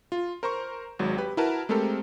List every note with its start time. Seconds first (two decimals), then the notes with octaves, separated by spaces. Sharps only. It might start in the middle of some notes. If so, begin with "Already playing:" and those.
0.12 F4
0.43 A#4 C5 A#5 C#6
0.99 G#1 G#2 F#3
1.17 G4 B4
1.37 E4 F#4 A#4 B4 A5
1.69 G#3 A3 C4 G4 A4 A#4